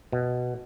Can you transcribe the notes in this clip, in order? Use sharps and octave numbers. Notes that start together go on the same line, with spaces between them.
B2